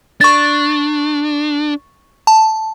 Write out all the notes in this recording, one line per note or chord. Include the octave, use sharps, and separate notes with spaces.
D4 C#6 A6
A5